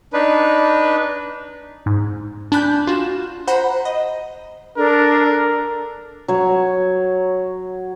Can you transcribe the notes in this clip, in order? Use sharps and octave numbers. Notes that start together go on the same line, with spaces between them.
D4 D#4 B4
G#2
D4 G#5 B5 F#6 G6
F4 F#4 E7
C5 F#5 A#5 B5
D#5
D4 A4 A#4
F#3 C#5